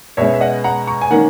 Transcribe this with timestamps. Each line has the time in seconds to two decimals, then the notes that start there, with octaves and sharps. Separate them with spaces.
0.17 B2 G#3 C#4 C#5 E5
0.34 E5
0.40 D#5 F#5
0.64 F#5 A#5
0.87 A#5 C#6
1.02 G#5
1.11 D#3 A#3 C#4 F#5 A#5